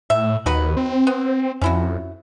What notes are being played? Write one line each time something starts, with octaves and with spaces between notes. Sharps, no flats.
A2 E5
D#2 D#4 F#4 B4
C4
B3
F2 C#4 E4 F#4